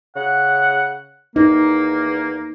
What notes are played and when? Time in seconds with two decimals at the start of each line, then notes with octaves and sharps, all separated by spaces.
0.16 C#3 F#5
1.36 E2 A#3 D#4